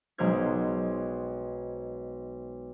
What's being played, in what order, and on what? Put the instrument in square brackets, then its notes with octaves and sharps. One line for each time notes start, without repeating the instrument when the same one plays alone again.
[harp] B1 G#3 B3 C5 F6 G#6